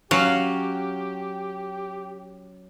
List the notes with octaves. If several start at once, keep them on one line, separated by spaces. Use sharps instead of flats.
F#3 C#4 G4 F5